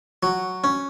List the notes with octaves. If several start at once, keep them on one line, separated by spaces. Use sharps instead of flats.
F#3
C#4